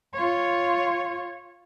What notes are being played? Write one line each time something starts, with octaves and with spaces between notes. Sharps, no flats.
F4 C#5